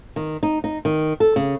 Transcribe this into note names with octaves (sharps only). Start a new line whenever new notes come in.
D#3
D#4
D#4
D#3
A4
C#3